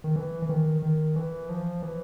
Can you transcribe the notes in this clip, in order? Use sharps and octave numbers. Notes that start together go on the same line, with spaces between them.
D#3
E3
E3
D#3
D#3
E3
F3
E3